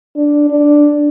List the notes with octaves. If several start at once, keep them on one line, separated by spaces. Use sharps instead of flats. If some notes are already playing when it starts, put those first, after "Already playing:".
D4
D4